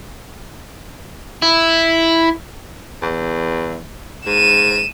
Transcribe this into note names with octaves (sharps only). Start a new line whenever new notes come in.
E4
E2
G#2 D#7 E7